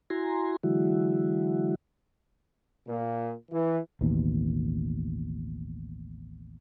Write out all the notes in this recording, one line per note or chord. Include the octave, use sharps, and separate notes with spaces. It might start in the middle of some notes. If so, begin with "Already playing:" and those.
E4 F#4 G#5 A#5 C6
D3 E3 F#3 G#3 E4 F#4
A#2
E3
A1 D#2 B2